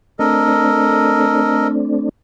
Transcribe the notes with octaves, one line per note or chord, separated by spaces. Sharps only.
A3 C4 D4 A4 A#4 D#5